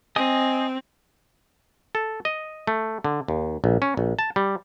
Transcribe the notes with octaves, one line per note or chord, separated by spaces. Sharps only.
C4 D#5 G#5 D#6
A4
D#5
A3
D3
D#2
A#1
C#4
A#1
A5
G3